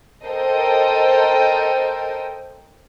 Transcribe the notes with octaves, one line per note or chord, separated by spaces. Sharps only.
A4 A#4 C5 D#5 G5